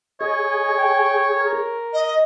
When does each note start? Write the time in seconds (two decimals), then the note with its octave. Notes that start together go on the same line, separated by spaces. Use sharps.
0.21 G#4 C#5 D#5
0.77 G5
1.39 A#4
1.93 D#5